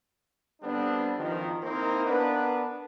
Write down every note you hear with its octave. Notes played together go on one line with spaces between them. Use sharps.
D3 G3 B3 C4 D4
G#1 D#3 F3
A#3 C4 D#4 E4 A#4 C5
B3 D4 A#4 B4